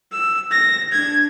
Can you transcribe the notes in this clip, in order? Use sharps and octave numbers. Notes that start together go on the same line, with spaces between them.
E6
A#6
D4 G#6